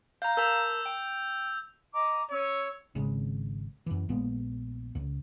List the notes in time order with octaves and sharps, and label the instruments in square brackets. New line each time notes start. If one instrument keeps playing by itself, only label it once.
[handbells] F5 A#5 [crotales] G6
[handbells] A#4 A5 [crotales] E6 G6 F7
[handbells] G5
[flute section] D#5 A#5 D6
[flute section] C#4 E6 [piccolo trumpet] C#5
[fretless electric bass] G#1 C#3 G#3
F#2 E3
A#1 A#2 G#3 B3
C#2